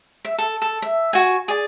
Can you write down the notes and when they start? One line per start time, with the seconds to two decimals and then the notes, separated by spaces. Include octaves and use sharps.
0.25 E5
0.38 A4
0.62 A4
0.82 E5
1.13 F#4 G#5
1.48 G#4 D5